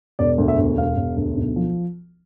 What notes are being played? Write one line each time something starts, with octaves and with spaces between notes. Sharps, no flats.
E1 D5
D2
E5
E1
E1 F5
E1
D2
B1
F3